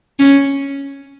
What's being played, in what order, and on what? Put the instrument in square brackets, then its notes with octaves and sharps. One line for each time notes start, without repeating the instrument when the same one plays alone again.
[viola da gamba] C#4